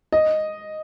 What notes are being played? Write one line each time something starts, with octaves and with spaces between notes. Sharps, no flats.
D#5